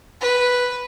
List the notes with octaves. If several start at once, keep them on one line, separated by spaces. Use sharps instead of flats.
B4